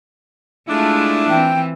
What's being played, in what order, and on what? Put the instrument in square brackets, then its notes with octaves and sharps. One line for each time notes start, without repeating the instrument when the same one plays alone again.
[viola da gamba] G#3 A3 F4 [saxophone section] D4 E4
[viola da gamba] E3 C4 [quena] G5